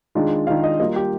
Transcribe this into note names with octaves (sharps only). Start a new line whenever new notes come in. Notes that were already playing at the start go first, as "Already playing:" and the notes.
D#3 G#3 D4 F4
D#3 G#3 D4 F4 F5
D#5
G3 A#3 F4 D#5
G4